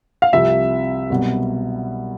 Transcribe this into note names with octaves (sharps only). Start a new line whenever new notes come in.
F5
C2 C3 F3 E5
C2 B2 F#3